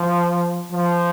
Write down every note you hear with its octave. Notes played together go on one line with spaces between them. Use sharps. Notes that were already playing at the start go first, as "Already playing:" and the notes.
Already playing: F3
F3